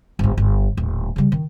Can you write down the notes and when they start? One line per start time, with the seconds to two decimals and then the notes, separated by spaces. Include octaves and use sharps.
0.19 G1 G#2
0.38 G1
0.77 D#1 A2
1.16 C#3 G3
1.32 D#3